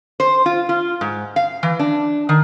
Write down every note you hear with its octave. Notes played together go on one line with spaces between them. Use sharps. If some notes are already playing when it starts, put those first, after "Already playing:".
C5
F4
F4
G#2
F5
E3
D4
D#3